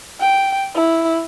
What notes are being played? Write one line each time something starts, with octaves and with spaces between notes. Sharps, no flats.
G5
E4